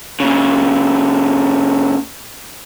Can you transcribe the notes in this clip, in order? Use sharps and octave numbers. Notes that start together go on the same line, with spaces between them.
A#2 C#3